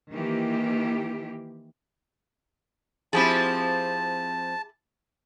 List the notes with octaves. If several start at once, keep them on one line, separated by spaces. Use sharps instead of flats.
D#3 E3 A#3 G4
F3 C4 E4 G4 G#4 A5